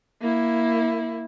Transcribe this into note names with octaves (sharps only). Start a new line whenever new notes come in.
A#3 E4